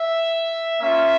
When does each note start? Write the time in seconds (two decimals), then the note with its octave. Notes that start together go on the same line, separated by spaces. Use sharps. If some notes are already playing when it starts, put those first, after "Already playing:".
Already playing: E5
0.81 A#3 C#4 F4 E5